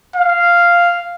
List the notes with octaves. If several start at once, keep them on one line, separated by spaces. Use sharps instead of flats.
F5